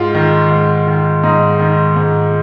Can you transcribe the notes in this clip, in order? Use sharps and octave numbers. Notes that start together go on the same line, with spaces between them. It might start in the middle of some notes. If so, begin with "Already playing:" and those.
Already playing: G#2 F4
D#3
G#2
D#3
G#2 D#4
D#3
G#2